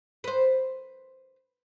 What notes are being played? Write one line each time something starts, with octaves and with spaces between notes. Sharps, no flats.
B4 C5